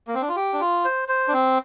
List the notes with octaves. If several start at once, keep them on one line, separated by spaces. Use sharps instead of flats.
A#3
C4
D4
F4
G4
D4
F4
C5
C5
D4
C4